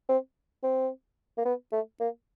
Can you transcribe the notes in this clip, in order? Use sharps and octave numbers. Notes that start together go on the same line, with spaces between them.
C4
C4
A#3
B3
A3
A#3